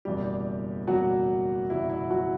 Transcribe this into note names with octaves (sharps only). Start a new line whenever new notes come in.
F#1 E2 B2 G3 G4
F#1 E2 B2 F#3 G3 F#4
F#1 E2 B2 G3 E4
E4
F#3 F#4